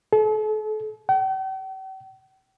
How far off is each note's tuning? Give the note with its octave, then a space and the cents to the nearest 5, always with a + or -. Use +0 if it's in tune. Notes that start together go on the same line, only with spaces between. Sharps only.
A4 -40
G5 -45